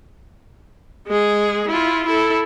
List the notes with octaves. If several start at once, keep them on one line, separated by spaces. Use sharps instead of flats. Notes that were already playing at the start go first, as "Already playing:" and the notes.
G#3 G#4
E4 F4
E4 A4